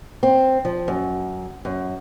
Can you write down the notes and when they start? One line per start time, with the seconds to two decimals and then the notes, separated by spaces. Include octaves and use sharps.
0.23 C4
0.65 F3
0.88 F#2
1.65 F#2